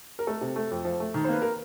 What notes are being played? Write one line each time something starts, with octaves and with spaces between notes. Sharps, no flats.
A#4
A3 A4
C3
A3
F2
F3
A3
D#3
C5
A#3 B4
A#4